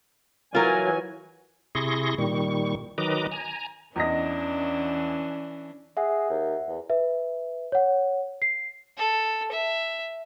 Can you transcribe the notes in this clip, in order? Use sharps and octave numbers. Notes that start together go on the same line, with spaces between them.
E3 F#3 F4 A#4 G#5
C3 E4 G#4 C6 C#6 A#6
A#2 D#3 G3 C#6
D#3 F#3 B4 D#5 A#5 D6
G#5 A#5
E2 E3 C#4 D4 D#5 A#6
G#4 E5 F#5
D#2
E2
B4 E5
C#5 F#5
C7
A4
E5